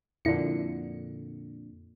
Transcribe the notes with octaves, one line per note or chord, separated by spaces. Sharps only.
F2 A#2 D3 E4 C#7